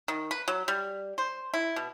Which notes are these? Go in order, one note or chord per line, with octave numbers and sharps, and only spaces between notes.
D#3
B4
F#3
G3
C5
E4
B2